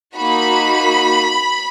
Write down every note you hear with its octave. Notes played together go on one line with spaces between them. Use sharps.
A#3 D#4 F#4 B5